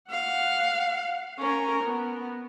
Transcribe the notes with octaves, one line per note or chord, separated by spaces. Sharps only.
F5 F#5
C#4 A#4
B3